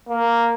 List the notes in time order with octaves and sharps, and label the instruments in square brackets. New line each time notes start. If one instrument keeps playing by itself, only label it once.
[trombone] A#3